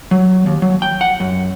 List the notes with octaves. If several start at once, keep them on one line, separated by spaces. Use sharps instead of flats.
F#3
D#2
F#3
G5
F#5
F#2